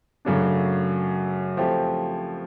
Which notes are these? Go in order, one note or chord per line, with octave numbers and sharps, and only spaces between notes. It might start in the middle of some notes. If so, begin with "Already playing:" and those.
F#2 C#3 F#3 A3 D4
F3 A3 C4 E4 G4